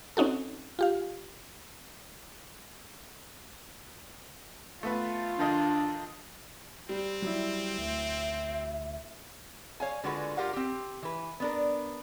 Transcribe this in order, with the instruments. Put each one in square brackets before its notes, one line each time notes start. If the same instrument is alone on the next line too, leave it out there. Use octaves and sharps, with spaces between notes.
[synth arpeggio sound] C4 C#4 D#4 F#4 A4
F4 G4 F5
[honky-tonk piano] A3 B3 B4 [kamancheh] F4
[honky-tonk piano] D#3 A4 D#5 [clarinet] D4
[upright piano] G3 [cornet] C4
[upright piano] F#3 E4 [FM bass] G3
[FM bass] D2 [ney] E5
[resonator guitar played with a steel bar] C#5 F5 G#5
D3 G#3 F4 F#4 G#4 B4
F4 G4 A#4 F5 F#5
C4 G4
E3 B4
B3 D4 A#4